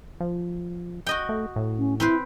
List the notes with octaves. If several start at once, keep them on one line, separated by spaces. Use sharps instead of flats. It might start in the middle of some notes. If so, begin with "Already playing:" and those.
F3
F#4 D#5 G5
A3
A2
C#4
C4 E4 B4 C5